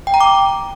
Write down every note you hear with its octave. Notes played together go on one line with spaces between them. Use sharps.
G5
A#5
D6